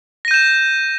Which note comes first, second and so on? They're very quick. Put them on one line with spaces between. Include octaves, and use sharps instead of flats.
A#6 D#7 G6 E7